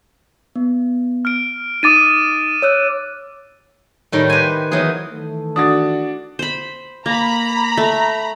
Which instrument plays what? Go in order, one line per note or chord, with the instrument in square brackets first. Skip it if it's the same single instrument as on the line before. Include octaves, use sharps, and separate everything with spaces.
[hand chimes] B3
[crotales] F6 D7
[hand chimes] D#4 D#6 [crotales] D6 A6 D#7
[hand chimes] C#5 E6 F#6
[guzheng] A2 D#3 G3
G4 B4 C5 G#5
D#3 E3 F#3 B3 G#4
[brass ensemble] D#3 E3 A3
[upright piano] D4 F#4 A6 [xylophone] D#6
[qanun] C5 B5
[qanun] A#3 [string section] A#5 B5
[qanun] A3